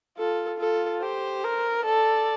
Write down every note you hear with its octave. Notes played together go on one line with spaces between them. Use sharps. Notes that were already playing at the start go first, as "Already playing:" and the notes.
F4 A4
F4 A4
G4 C5
A#4
A4 D5